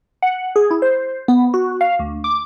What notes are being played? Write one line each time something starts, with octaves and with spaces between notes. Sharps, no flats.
F#5
G#4
E4
C5
B3
F#4
F5
D2
D6